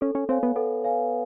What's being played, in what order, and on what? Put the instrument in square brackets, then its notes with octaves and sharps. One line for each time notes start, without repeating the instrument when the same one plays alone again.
[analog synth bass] C#4 [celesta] A4
[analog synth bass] C#4
[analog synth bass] C4 [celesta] C#5 F5 G#5
[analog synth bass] B3
[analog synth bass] B3 [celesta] A4
[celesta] C#5 F5 G#5